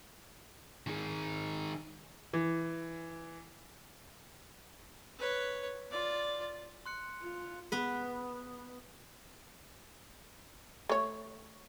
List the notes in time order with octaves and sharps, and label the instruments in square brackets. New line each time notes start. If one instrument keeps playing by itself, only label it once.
[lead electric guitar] D#3 G#4
[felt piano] E3
[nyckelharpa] B4 C#5
F4 D5
[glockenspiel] C6 F#6 C#7
[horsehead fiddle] F4
[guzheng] B3 B4
[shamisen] A3 C#5